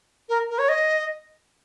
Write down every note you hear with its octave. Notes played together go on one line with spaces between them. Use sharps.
A#4
A#4
C#5
D#5